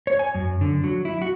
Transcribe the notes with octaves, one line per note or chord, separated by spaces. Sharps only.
C#5
G#5
F#2
D3
F#3
E4
F#4